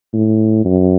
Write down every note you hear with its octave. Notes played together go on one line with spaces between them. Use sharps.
A2
F#2